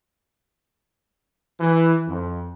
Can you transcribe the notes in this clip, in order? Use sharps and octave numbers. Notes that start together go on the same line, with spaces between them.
E3
F2